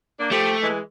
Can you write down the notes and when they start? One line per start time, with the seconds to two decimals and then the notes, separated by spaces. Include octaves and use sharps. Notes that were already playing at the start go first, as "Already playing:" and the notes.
0.19 A#3 D4
0.31 F3 A3 G4
0.62 E3 G#3